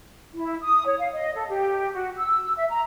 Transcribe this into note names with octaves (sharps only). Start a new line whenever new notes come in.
E4
D#6
C#5
F5
D#5
A4
G4
F#4
E6
E5
A#5